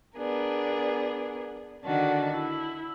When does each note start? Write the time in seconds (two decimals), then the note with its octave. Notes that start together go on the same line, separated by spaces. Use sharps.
0.17 B3 D4 G#4 A#4
1.84 D3 D#3 D4 F#4 A5
2.34 E4